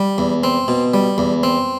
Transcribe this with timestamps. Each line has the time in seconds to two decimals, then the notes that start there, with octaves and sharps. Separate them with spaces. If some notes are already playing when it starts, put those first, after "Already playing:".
Already playing: G3
0.18 E2
0.44 C4
0.68 B2
0.94 G3
1.18 E2
1.43 C4